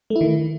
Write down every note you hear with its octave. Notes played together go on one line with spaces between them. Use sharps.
A3
E4
D#3